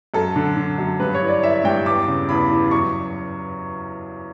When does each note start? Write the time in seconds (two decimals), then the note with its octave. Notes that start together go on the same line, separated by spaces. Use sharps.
0.14 F#2 A4
0.36 D3
0.57 D3
0.78 F#2
1.00 G2 B4
1.14 C#5
1.21 E3
1.28 D5
1.43 E3 E5
1.64 G2 G5
1.86 E2 D6
2.07 C#3
2.29 E2 B5
2.51 E3
2.71 F#2 C#6